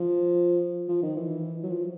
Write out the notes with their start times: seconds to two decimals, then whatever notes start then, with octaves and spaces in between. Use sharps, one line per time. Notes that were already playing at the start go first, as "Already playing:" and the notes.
Already playing: F3
0.88 F3
1.03 D#3
1.16 E3
1.63 F#3
1.71 F3